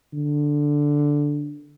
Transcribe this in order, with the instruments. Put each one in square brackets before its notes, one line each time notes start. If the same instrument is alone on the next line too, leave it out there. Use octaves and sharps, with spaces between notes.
[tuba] D3